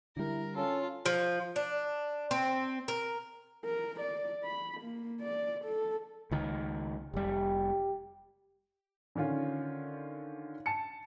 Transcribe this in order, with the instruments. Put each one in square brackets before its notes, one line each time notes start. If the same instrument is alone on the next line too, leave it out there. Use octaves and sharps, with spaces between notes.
[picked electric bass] D3 G3 [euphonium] E4 [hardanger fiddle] A#4
[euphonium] C#4 [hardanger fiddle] F4 [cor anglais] A4
[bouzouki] F3
D4
C4
A#4
[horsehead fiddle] A#4
D5
B5
A#3
D5
A4
[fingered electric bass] C#2 D#3
[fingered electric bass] F1 G3 [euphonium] G4
[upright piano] D3 D#3 C#4 F4
A5 C#7